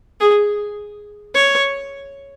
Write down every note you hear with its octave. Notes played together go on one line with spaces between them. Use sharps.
G#4
C#5